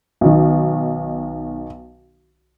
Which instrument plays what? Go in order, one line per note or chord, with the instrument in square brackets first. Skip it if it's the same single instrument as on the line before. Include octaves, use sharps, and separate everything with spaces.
[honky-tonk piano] B1 D#3